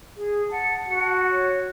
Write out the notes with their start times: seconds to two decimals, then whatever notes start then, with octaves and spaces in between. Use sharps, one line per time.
0.17 G#4
0.51 F#5 A5
0.88 F#4
1.31 C#5